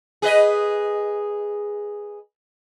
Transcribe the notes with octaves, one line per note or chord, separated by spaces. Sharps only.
G#4 B4 D#5